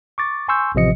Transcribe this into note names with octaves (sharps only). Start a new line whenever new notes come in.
C#6 D6 A6
G#5 C6 C#6 E6 G6
A1 C3 F3 D#5 C#7